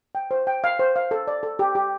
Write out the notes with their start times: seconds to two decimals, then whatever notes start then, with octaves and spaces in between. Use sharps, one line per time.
0.15 G5
0.31 C5
0.47 G5
0.64 F5
0.79 C5
0.96 F5
1.11 A4
1.27 D5
1.43 A4
1.59 G4
1.75 G4